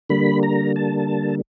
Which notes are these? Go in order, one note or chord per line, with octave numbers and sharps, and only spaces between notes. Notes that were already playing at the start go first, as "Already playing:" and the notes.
D3 G3 A#3 B5
A#5
A5